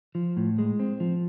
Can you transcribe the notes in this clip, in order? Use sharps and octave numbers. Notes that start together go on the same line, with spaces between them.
F3
A2
G#3
C4
F3